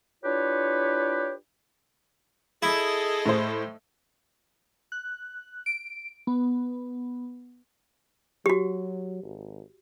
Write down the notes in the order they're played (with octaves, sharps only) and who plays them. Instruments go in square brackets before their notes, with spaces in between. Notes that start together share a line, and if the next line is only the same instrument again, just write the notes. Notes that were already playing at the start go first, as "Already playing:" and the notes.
[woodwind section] D4 E4 F4 G4 B4 C#5
[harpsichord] E4 [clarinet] G#4 [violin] A4 D#5
[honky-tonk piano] A2 C5
[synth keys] F#6
D7
B3
[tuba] F#3 [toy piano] F#4 G4
[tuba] G#1